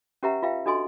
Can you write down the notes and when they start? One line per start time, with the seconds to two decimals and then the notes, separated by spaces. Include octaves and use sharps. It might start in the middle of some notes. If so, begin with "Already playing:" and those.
0.23 C#4 G4 B4 E5 F#5 A#5
0.43 F4 B4 E5 F5 G5
0.66 D4 F#4 A4 D#5 G#5 C6